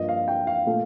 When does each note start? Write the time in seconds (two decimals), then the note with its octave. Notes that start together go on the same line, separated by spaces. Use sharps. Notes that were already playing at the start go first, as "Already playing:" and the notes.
Already playing: G2 F3 A#3 D#5
0.09 F5
0.28 G5
0.47 F5
0.66 A#2 A3